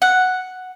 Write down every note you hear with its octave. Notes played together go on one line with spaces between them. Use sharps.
F#5